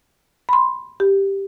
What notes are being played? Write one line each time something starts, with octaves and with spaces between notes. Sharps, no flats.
B5 C6
G4